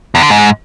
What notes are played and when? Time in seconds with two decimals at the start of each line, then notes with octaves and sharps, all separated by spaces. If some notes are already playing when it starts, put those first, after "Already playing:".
0.15 E2
0.23 D3
0.30 G#2